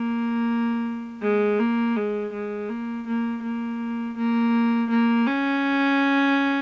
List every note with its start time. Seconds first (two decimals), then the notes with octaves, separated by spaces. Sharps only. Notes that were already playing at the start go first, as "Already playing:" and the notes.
Already playing: A#3
1.22 G#3
1.59 A#3
1.96 G#3
2.32 G#3
2.69 A#3
3.07 A#3
3.42 A#3
4.17 A#3
4.90 A#3
5.27 C#4